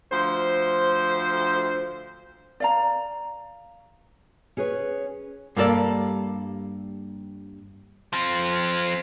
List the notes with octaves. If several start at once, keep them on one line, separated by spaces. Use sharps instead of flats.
D2 F3 C5
D5 F5 A#5
C#4 G#4 B4 C#5
G2 G3 A#3 A4 D5
F3 C4